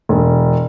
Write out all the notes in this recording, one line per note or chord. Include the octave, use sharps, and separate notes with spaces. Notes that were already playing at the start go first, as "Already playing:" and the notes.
E1